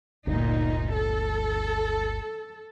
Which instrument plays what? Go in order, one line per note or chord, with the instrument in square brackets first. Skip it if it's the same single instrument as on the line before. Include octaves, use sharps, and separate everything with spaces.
[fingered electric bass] G1 D2 [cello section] A#2 D#4
[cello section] A4